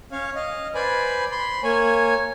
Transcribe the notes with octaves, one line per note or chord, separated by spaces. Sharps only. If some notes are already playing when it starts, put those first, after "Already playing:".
C#4 C#5 F5
D#5 F5
B4 C5 D5 G#5 B5
B5 C6
A#3 C#5 G#5